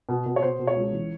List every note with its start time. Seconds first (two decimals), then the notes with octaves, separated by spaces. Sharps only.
0.09 B2
0.26 B2
0.36 C#5
0.42 B2 C5
0.59 B2
0.67 C#5
0.76 C#2
0.93 E3